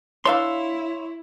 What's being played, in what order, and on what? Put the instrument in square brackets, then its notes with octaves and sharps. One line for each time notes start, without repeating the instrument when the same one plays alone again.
[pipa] D4 E5 F5 [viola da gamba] E4 [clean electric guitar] C#5 C6